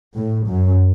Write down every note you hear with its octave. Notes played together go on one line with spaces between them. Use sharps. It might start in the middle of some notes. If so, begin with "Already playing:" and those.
A2
F#2